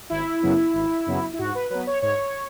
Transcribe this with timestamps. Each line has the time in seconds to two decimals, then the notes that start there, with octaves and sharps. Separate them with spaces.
0.10 G#1 E4
0.43 F#2 C#3 F#3 B3
0.74 G#1
1.06 F#2 C#3 F#3 B3
1.33 E4
1.39 G#2 F#4
1.55 B4
1.70 F#3 B3 B4
1.87 C#5
2.02 G#2 C#5